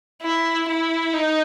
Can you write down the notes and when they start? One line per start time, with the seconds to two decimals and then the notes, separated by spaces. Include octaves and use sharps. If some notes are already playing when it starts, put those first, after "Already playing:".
0.22 E4
0.68 E4
1.14 D#4